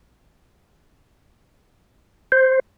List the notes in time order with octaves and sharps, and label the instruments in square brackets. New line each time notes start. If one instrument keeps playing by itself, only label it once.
[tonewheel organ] C5